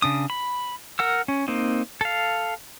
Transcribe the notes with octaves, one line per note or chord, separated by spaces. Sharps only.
C#3 D4 D#6
B5
A#4 F#5 E6
C#4
A#3 C4 D#4
A4 F5